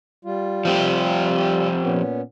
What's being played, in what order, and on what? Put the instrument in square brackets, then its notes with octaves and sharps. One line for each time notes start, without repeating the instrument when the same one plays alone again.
[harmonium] G3 F4
[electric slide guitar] F3 C4 G4
[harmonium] A#2 B3 C#4